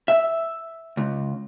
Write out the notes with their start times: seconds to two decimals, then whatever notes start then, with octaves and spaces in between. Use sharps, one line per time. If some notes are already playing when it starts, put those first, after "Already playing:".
0.08 E5
0.97 C#2